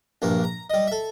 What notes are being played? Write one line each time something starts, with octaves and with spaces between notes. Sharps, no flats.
A#1 G2 A#3
A#5
G3 D#5
A4 E5